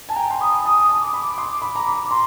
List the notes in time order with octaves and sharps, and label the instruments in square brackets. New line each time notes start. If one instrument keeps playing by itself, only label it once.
[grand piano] G#5 [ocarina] A5
[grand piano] G5 [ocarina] A#5
[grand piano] C6
[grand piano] B5 [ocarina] D#6
[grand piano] A5 [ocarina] D#6
[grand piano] A5
[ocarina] D6
[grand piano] B5
C6
B5
A#5
B5
[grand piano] A#5 [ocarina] C6